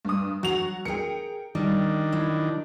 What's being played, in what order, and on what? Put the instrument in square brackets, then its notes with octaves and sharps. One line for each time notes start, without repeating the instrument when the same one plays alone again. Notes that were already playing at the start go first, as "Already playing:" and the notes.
[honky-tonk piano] G2 D#6
[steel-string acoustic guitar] F#3 F#5 [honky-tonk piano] F#4 F7
[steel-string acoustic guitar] G#4 A#4 [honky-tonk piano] G5 C#7
[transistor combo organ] D#3 D4 [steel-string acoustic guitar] G3
[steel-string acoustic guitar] F#3 E4